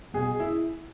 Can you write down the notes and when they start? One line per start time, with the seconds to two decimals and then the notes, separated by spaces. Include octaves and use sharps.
0.14 B2 G#4
0.40 E4